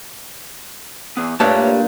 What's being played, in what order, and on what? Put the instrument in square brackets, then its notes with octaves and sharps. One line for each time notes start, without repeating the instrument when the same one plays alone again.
[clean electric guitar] E3 B3
[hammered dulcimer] G2 A#2 [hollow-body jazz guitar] G3 A3 A5 [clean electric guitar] B4 C#5 E5